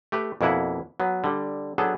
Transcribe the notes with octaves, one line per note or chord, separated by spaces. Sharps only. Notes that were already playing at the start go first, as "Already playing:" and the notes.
A3 G4 B4
F2 B2 A#3 E4 F#5 G#5
F#3 B3
D3 G3
F#3 B3 D4 G#4 A4